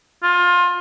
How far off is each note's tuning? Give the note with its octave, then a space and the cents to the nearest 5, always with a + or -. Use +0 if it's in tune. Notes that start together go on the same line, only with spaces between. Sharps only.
F4 +25